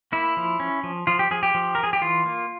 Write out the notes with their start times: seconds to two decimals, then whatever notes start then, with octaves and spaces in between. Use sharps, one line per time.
0.12 A#3 E4
0.37 F3
0.60 C#4
0.83 F3
1.07 F3 F4
1.19 G4
1.31 F3 G#4
1.43 G4
1.55 F3
1.75 F3 A#4
1.83 G#4
1.93 G4
2.01 E3 F4
2.26 A#3